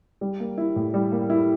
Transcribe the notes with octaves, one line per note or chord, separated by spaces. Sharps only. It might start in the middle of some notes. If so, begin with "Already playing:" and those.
G3
A#3
E4
A2
G3
A#3
E4